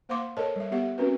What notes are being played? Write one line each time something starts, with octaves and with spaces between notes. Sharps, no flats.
A#3 C5 F5 F#5 C6 D6
A4 A#4 C5 C#5 D#5 A5
G3 E5
G3 B3 G4 E5 F#5
C4 C#4 F#4 A#4 B4